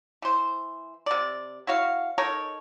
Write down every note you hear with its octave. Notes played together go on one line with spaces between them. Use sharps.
E3 C5
C3 D5
E4 F#4 C#5 F5
D#4 A4 A#4 C#5